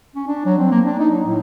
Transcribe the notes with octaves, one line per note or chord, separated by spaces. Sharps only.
C#4
D4
F#3
C4
A#3
D4
D#4
F#3
A2